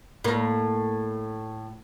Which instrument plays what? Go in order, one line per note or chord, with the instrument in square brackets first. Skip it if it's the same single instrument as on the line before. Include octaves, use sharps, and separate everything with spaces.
[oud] A2 A#3